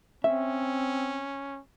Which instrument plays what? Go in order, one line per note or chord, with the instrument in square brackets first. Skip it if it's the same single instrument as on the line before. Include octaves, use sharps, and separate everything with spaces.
[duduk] C4 [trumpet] C#4 [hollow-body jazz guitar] E5